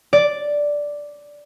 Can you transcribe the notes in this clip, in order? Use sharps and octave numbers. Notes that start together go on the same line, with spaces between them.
D5